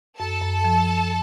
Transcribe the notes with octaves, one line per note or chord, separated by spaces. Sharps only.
F#2 A4 A5
F#2
F3